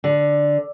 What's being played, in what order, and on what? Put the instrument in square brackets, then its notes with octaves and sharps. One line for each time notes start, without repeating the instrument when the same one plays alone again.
[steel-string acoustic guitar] D3